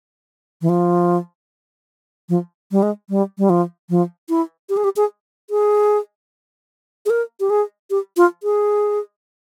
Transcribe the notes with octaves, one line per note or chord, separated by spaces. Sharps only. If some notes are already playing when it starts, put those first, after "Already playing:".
E3
F3
F3
G3
G#3
G3
G3
F3
F3
E4
G4
G#4
G4
G#4
G#4
G#4
A#4
G4
G#4
G4
F4
G#4